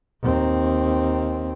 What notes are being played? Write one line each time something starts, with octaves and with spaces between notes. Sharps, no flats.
D#2 C4